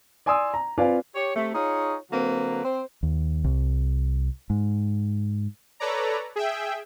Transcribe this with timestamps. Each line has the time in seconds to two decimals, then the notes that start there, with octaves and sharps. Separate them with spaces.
0.26 D5 G#5 C6 D#6 E6
0.54 A#5
0.78 C4 F4 B4 D5 F5 G#5
1.15 G4 C#5
1.35 C3 A3
1.54 D#4 F4 G#4 C#5
2.12 D3 F#3 A#3 C4 B4
2.64 C4 C5
3.03 D#2
3.44 C2
4.50 G#2
5.80 A4 B4 C#5 D5 A#5
6.36 G#4 E5 G5